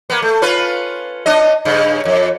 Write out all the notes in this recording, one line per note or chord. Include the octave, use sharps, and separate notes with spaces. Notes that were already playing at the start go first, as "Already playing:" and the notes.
A#3 B3
A3
C#4 F4 B4
C#4 D4 D#5
G2 C#3
F2